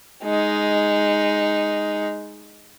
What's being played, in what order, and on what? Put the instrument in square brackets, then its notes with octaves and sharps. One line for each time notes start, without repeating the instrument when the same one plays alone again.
[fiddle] G#3 D#4